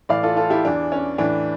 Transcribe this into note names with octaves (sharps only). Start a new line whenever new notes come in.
A2 E3 D5 F5
F4 A4
F4 A4
E4 G4
E2 E3 D4
C#4
A2 E3 D4